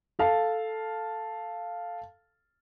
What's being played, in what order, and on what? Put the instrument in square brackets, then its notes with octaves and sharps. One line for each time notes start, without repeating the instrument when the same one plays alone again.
[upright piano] A4 F5 A5